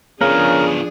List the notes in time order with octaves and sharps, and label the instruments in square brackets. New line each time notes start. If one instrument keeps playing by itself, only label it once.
[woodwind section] C#3 [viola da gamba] F3 D4 G#4 [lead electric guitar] B3 F4 [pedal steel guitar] A#4